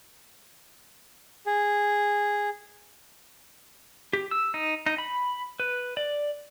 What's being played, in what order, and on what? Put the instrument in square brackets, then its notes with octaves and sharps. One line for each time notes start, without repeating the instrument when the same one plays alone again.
[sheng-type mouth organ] G#4
[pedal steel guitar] G4
E6
D#4
D#4
B5
B4
D5